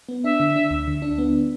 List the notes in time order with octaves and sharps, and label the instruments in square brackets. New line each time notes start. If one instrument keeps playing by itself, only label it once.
[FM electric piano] B3
[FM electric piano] D4 [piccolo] E5
[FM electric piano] D3
D4
D2
D3
D4
B3